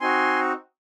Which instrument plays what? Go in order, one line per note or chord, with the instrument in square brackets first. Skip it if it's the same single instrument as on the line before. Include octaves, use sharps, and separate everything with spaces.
[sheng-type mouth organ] C4 D#4 F#4 G#5 C6